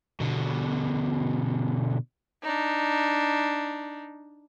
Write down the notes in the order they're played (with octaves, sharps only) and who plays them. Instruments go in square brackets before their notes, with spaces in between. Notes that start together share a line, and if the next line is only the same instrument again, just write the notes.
[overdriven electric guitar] B2 D3
[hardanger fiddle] D4 D#4